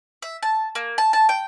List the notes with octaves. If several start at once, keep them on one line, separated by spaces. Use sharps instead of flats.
E5
A5
A#3
A5
A5
G5